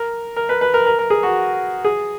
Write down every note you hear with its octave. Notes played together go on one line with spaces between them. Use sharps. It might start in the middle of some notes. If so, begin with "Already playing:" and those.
Already playing: A#4
A#4
B4
B4
A#4
A#4
A#4
G#4
F#4
G#4